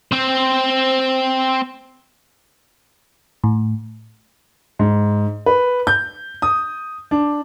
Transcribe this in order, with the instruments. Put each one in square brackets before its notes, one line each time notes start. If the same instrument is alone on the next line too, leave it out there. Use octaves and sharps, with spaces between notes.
[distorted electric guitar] C4 C5
[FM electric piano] A2
[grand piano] G#2
B4
G6
D#6
D4